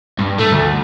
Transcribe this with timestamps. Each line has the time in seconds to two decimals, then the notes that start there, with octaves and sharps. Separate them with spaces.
0.19 G2
0.38 A3
0.52 D2